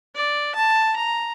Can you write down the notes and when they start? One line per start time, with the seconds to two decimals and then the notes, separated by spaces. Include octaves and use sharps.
0.15 D5
0.55 A5
0.96 A#5